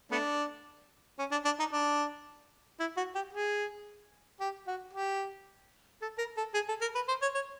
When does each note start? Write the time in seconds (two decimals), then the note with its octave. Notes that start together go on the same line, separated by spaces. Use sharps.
0.11 A3 B3 D4
1.19 C#4
1.31 D4
1.45 D4
1.59 D#4
1.72 D4
2.80 E4
2.97 F#4
3.15 G4
3.33 G#4
4.40 G4
4.67 F#4
4.93 G4
6.01 A4
6.18 A#4
6.37 A4
6.54 G#4
6.68 A4
6.81 A#4
6.95 B4
7.08 C5
7.22 C#5
7.35 C#5